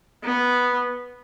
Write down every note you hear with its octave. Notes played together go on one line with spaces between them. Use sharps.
B3